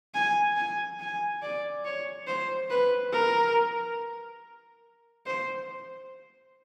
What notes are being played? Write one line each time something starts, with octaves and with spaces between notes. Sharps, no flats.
G#5
G#5
G#5
D5
C#5
C5
B4
A#4
C5